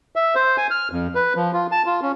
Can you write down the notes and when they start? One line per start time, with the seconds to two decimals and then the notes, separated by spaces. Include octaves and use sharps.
0.16 E5
0.35 C5
0.57 G#5
0.70 F6
0.92 F2
1.15 B4
1.36 F3
1.54 F4
1.72 A5
1.86 F4
2.02 C#4